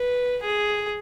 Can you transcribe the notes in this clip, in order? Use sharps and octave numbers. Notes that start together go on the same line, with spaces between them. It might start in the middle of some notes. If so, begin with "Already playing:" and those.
Already playing: B4
G#4